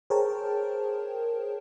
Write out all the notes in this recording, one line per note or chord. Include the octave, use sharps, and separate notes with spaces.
G#4 A#4 C5 C#5 G5 A5